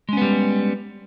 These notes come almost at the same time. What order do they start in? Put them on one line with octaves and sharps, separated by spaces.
G#3 C#4 B3 G3